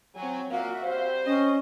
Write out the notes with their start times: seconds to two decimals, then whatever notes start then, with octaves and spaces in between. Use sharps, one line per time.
0.16 F#3 C4 G#5
0.51 A#2 A#3 F#4 E5 F5
0.84 G3 C4 C5
1.26 C#4 C#5 D#5